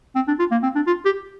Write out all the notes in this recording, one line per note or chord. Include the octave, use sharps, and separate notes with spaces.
C4
D4
F4
A#3
C4
D4
F4
G4